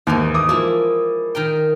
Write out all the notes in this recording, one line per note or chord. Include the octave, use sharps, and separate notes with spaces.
D#2 G#2 E3 D#4
D6 D#6
F3 G#3 A#3 E4
D#3 A#4 G5